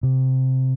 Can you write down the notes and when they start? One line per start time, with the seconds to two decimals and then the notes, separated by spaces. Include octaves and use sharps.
0.03 C3